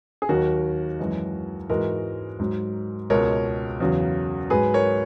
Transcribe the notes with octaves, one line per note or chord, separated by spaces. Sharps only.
G#4
D#2 D#3 F#3 F#4 A#4
F#2 E3 G#3
G#2 E3 G#3 F#4 A#4
G#2 F#3
C#2 B2 G#3 A#4 C#5
E2 C#3 F#3
G#2 F#3 G#4 B4
A#4 C#5